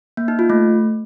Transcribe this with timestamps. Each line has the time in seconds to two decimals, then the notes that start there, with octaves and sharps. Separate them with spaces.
0.17 A#3
0.28 D#4
0.39 F4
0.50 A3